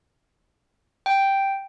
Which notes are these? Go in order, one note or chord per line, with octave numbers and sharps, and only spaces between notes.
G5